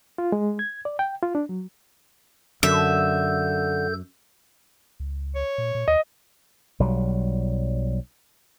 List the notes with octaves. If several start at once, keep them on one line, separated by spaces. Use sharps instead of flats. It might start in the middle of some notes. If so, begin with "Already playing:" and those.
F4
G#3
G#6
D5
G5
F4
D4
F#3
F#2 D3 A4 E5 G6
C#2
C#5
A#2
A#2
D#2 D#5
B1 F#3 G3